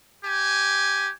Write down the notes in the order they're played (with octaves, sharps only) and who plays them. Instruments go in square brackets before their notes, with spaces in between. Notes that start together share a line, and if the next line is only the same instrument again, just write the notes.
[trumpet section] G4 G#5